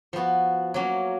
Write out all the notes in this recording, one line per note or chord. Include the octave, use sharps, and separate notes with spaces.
F3 B3 F#4
F#3 A#3 C#4